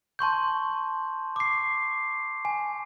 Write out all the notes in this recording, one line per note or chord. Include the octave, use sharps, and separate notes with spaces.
A5 C6 C#6 G6
D6 C7
G#5